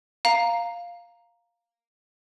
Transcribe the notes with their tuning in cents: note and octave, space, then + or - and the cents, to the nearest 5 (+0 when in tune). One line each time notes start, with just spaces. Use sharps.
F5 +0 A#5 +0